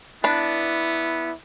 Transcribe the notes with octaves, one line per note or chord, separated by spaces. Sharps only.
B3 D4 E4 B4